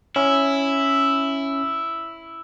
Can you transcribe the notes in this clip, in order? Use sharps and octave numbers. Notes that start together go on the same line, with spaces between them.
C#4 E4